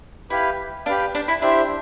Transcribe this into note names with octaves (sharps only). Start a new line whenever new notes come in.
E4 G4 B4 F5
D4 G4 B4 F5
D4
E4
D4 E4 G4 C5 E5